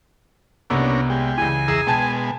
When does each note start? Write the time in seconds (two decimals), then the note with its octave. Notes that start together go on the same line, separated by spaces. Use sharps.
0.70 C2 A#3 B3 C#4 D4 E6
1.10 G#3 G4
1.38 C#2 E3 G#5
1.68 E2 G#4 A#5 E6
1.87 B2 G#3 G5 A5 G#6